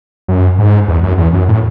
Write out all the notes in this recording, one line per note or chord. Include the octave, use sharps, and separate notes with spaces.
F#2
G#2
E2
F#2
E2
F#2
A2